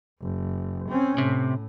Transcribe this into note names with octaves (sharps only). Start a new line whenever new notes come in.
F#1
C4 C#4
A2 C3